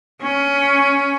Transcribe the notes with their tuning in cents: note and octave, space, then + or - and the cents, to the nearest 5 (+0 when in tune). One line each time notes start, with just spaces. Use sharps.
C#4 +15